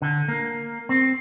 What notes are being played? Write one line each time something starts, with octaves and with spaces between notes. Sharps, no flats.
D3
A#3
C4